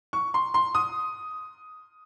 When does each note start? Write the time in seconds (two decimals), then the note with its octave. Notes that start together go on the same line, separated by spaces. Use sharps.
0.13 C#6
0.34 C6
0.54 C6
0.75 D#6